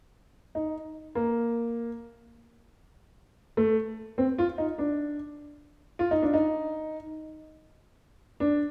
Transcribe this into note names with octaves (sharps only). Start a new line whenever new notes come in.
D#4
A#3
A3
C4
F4
D#4
D4
F4
D#4
D4
D#4
D4